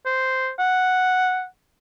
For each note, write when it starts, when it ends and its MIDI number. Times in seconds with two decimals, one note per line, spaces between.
0.06 0.50 72
0.59 1.45 78